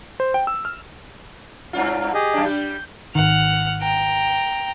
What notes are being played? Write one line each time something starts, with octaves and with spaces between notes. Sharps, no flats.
C5
G5
E6
F6
G2 C#4 F4
G4 G#4 D#5
F#2 D4
G3 G4 G6
G#1 D#3 F#5 F6
G5 A#5